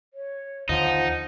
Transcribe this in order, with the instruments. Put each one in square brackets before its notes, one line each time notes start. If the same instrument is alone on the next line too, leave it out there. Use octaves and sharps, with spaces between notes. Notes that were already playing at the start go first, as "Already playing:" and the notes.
[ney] C#5
[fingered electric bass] D#2 D3 [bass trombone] F3 [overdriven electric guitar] D#4 [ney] F#5